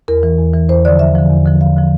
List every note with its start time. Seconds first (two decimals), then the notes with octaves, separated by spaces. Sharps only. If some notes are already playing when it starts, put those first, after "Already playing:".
0.08 E2 A#4
0.23 E3
0.39 E2
0.54 E3
0.69 E2 C5
0.85 D3 F3 D5
0.99 E2 E5
1.15 D3 F3
1.30 E2
1.46 D3 F3
1.61 E2 F5
1.76 D3 F3